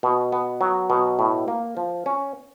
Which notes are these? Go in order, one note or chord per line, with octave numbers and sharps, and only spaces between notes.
B2
B3
F#3
B2
A2
A#3
F3
C#4